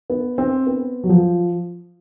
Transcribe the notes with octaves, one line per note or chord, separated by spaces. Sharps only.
B3
C4
B3
F#3
F3